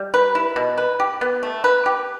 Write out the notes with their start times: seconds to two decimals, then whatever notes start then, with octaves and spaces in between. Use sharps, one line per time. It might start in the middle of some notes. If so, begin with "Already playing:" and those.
Already playing: G3
0.14 B4
0.35 E4
0.56 B2
0.78 B4
1.00 G4
1.21 B3
1.43 A3
1.64 B4
1.86 G4